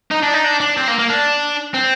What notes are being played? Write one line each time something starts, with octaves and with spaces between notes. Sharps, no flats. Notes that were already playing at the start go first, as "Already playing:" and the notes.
D#4
D4
D#4
D4
D4
C4
A#3
A#3
D4
C4